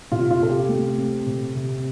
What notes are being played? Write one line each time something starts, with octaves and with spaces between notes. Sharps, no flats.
C3 F4
F4
C3 A4
G4
A3
C4
C3
C3